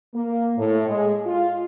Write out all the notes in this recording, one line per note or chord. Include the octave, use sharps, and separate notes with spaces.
A#3
A2
G#3
F4